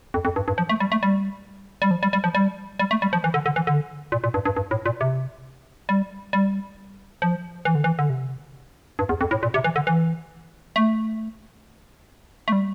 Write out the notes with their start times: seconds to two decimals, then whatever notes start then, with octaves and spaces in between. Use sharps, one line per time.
0.14 F2
0.25 F2
0.36 G2
0.48 G2
0.58 F3
0.69 A3
0.80 G3
0.92 A3
1.03 G3
1.82 G3
1.91 F3
2.03 G3
2.13 G3
2.24 F3
2.35 G3
2.79 G3
2.91 A3
3.02 G3
3.13 F3
3.24 E3
3.34 D3
3.46 D3
3.56 E3
3.67 D3
4.12 A#2
4.24 A#2
4.34 G2
4.45 G2
4.57 G2
4.71 A2
4.86 A#2
5.01 C3
5.89 G3
6.33 G3
7.22 F3
7.65 E3
7.75 D3
7.84 E3
7.99 D3
8.10 C3
8.99 G2
9.09 E2
9.21 F2
9.31 A2
9.43 A#2
9.54 C3
9.64 E3
9.76 D3
9.87 E3
10.76 A3
12.48 A3
12.52 G3